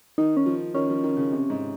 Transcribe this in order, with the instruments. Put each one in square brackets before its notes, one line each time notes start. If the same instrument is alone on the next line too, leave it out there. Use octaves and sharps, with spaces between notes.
[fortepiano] D#3 [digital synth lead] D#4
[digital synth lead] C#4
[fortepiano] F3
[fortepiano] D#3 [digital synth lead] C#4
[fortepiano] F3
D#3
C#3
C3
G#2